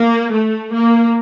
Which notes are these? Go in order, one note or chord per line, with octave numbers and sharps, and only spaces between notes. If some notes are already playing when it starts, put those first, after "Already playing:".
Already playing: A#3
A3
A#3